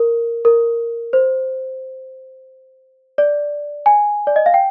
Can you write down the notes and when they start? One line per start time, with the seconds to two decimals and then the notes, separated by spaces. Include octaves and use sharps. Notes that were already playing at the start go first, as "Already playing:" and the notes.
Already playing: A#4
0.45 A#4
1.13 C5
3.18 D5
3.86 G#5
4.27 D5
4.36 D#5
4.46 F5
4.54 G5